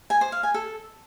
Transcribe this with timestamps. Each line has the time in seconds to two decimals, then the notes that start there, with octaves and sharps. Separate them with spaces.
0.10 G#5
0.21 C5
0.32 F5
0.43 G#5
0.54 A4